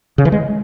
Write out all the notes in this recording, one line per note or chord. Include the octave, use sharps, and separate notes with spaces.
C#3
E3
G#3